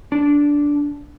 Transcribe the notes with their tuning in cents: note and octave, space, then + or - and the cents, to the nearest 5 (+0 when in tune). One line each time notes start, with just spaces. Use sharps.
D4 -10